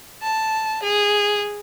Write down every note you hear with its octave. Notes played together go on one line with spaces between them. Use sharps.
A5
G#4